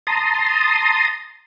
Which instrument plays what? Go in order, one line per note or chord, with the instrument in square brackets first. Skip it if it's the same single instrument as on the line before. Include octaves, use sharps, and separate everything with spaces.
[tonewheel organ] A5 A#5 C6 D#6